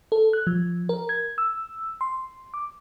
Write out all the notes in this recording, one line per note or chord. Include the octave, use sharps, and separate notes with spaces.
A4
F#6
F3
A#4
G#6
E6
C6
D6